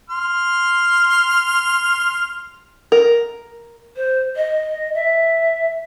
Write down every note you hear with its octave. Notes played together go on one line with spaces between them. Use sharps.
C6 F6
A#4
C5
D#5
E5